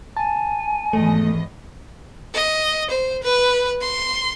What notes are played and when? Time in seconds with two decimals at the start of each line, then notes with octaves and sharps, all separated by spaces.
0.17 G#5 A5
0.93 G#1 E2 A3 D#5
2.34 D#5
2.90 C5
3.23 B4
3.81 C6